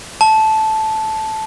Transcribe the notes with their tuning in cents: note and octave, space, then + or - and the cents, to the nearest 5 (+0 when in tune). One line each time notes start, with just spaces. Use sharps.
A5 -10